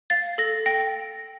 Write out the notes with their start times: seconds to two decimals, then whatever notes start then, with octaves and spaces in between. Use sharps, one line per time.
0.10 F5 A6
0.38 A4 A#6
0.66 G5 A#6